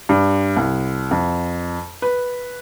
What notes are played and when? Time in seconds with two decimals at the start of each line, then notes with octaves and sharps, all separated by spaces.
0.09 G2
0.57 C2
1.11 F2
2.02 B4